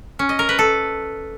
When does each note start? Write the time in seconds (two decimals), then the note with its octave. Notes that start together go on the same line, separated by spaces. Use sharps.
0.19 C#4
0.29 D#5
0.39 A#4
0.49 B4
0.59 A4